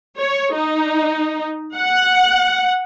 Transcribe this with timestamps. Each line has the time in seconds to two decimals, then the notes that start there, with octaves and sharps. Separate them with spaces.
0.18 C#5
0.54 D#4
1.76 F#5